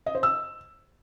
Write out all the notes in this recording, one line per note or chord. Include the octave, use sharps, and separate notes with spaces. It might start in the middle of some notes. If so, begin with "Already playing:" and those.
D#5
C5
E6